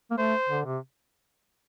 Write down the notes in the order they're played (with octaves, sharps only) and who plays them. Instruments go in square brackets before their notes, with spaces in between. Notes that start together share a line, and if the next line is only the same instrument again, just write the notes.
[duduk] A#3
[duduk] A3 [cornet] C5
[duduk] D3
C3